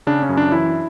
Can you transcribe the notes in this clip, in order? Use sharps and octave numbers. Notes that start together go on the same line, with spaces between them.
C#3 D4
C#4
F#2
D4
E3 E4